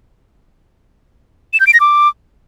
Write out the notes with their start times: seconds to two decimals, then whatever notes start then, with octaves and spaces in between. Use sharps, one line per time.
1.53 E7
1.60 G6
1.67 D7
1.74 A#6
1.80 D6